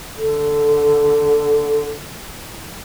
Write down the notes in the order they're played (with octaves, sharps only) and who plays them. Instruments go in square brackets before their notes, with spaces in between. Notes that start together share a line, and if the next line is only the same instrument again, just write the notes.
[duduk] D3 [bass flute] A4